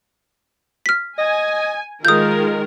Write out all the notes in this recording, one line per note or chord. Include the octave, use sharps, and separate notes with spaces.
F6 B6
D#5 G#5
D#3 G#3 F4 A#4 D#6 G6